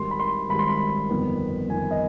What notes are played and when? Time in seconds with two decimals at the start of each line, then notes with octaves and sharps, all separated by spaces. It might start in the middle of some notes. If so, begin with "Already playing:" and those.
Already playing: G#1 G#2 D#3 G3 C6
0.11 B5
0.20 C6
0.49 G#1 G#2 D#3 G3 B5
0.59 C6
0.69 B5
1.09 G1 F2 D#3 B3
1.69 G1 F2 D#3 B3 G#5
1.91 D#5